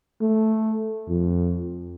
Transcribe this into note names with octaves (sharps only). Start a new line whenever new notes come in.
A3
F2